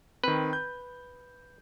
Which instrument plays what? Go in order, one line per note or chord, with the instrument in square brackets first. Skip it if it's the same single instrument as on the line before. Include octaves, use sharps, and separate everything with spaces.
[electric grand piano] D#3 C4 [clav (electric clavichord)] B4
[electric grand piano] G6